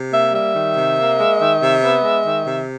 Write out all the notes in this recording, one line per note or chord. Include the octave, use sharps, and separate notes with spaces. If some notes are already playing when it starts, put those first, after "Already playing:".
Already playing: C3
A#3 E5
G3 E5
D#3
C3
A#3
G#3
D#3
C3
B3
G#3
D#3
C3